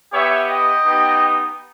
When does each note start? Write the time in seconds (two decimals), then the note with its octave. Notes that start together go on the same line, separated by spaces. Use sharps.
0.13 B3 G4 C#5 E5
0.49 D#5 G5
0.85 B3 D#4 G4